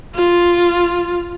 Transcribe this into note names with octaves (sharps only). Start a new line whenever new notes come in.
F4